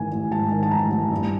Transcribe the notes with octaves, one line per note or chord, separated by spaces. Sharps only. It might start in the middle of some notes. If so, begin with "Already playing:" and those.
Already playing: A1 G#2 D#3 G#5
A1
G#2 A5
D#3
A5
A1 A#5
A1
G2